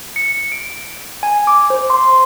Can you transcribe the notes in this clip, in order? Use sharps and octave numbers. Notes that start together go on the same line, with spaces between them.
C#7
D7
G#5
D6
C5
C6